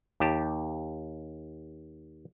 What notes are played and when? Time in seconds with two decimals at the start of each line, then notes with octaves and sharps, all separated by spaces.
0.20 D#2 G4 A5